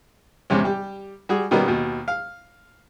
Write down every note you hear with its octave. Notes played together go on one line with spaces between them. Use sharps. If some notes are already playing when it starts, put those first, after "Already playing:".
E2 G#2 C3 C#4
G3 G4
G3 F#4 G#4
B2 D#3 G3 A#3 B3 C#4
D#2 B2
F5